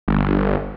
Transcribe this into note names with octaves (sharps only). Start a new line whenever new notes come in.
G1